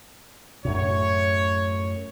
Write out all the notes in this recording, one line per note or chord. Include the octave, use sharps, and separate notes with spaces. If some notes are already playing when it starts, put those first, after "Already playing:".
F#2 A2 C#5